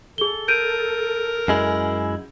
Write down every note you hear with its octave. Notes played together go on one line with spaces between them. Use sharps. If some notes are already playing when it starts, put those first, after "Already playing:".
G#4 A4 G7
A#4 G6 D7 D#7
F#2 G#3 E4